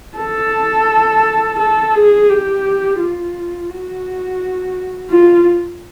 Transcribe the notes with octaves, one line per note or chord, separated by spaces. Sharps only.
A4
A4
G#4
G4
F4
F#4
F4